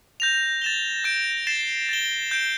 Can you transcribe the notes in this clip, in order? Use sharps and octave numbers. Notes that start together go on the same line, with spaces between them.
G6 A#6 F7
A6 E7 G7
G6 A#6 D7
A6 C7 E7 G7
A6 E7 G7
G6 D7 G7